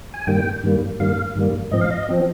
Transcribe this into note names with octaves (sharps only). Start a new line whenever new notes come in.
G#5
G2 D#3 G3 A#3 G5
G2 D#3 G3 A#3
G2 D#3 G3 A#3 F5
G2 D#3 G3 A#3
G#2 F3 C4 D#5
F5
D#5
F3 C4